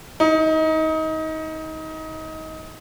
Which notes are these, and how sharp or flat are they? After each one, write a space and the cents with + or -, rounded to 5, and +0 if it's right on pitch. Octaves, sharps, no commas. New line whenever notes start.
D#4 +25